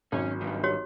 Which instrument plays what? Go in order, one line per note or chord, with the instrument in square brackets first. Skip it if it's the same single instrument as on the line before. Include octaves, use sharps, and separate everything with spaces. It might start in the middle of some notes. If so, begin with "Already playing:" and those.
[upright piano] G#1 F#3 [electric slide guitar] C#4
[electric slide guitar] G2 D#3
[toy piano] F#4 G4 C#5